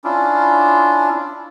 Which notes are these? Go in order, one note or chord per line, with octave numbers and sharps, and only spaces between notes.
C#4 D4 E4 F4